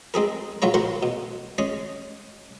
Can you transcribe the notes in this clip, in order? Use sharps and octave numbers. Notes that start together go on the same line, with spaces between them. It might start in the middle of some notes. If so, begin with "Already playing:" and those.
G#3 C4 G#4 A#4
A#1 F#3 F4 C#5 A#5
F#4 A#4 C5 F#5
B2
G#3 C#4 G#4